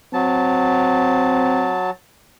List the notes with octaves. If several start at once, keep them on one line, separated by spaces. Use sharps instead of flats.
F#3 C4 A5